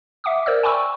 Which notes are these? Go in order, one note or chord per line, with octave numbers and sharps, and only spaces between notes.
E5 F#5 D6 D#6
A#4 C5 D5 E6
G5 G#5 B5 C#6 E6